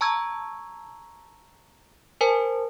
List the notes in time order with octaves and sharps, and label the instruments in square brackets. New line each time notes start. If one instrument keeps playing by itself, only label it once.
[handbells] A5 A#5 C#6 E6 G#6
A#4 C5 G#5 A5